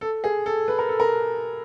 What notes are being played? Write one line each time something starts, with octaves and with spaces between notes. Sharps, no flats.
A4
G#4
A4
B4
A#4
A4
A#4